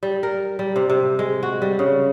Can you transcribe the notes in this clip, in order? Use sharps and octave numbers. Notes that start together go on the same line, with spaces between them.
G3
A#4
G3
C3
C3
G#3
F#4
G3
C#3